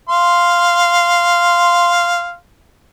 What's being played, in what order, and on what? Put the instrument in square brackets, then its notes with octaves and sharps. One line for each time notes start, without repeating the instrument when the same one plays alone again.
[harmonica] F5 C6